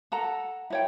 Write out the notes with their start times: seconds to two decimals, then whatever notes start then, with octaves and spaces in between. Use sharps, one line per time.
0.12 A4 F#5 A#5
0.70 E4 C#5 G5